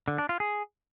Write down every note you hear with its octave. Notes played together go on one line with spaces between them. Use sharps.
D3
D4
F4
G#4